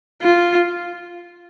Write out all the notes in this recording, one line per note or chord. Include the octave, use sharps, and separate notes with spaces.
F4